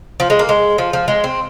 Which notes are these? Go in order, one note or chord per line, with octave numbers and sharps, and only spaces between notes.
F3
G#3
A#3
G#3
F3
F3
G#3
C4